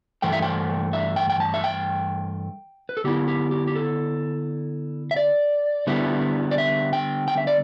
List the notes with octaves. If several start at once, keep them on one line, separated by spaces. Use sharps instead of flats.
G2 E3 A3 G5
E5
G5
E5
G5
G5
A5
E5
G5
B4
A4
D3 B3 E4 G4
G4
G4
G4
A4
E5
D5
D3 G3 B3 E4
D5
E5
G5
G5
E5
D5